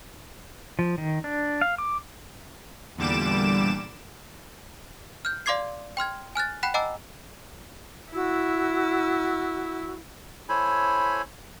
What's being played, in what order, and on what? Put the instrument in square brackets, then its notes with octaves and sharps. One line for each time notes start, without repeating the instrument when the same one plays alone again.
[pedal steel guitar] F3
D#3
D4
F5
D6
[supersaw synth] E2 A#2 D3 G3 D6 E7
[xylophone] F6 G6
D5 F5 C6 D6 G#6 C7
G5 C6 F6 G#6
G#5 F6 F#6 A6
F#5 G5 B5 F#6 B6 E7
D#5 F#5 G#5 A#5 D6 E6
[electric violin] E4 [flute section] F#4 E6
[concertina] E4 A4 C5 C#5 G#5 B5